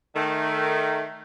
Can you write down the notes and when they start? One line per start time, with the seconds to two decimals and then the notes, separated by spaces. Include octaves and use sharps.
0.14 D#3 A3